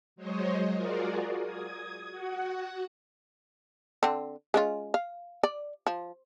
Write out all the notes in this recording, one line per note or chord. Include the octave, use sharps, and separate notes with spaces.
F#3 G#3 C5 C#5 D#5
F4 F#4 G#4 A#4 D5
D#6 G#6
F#4 F#5
D3 C4
G#3 C#4 F4
F5
D5
F3